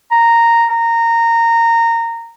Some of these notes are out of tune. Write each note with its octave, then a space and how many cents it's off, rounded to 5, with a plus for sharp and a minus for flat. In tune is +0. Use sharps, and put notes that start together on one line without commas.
A#5 -5
A#5 -15